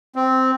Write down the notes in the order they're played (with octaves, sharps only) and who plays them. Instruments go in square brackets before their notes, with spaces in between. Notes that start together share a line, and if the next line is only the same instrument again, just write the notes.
[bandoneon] C4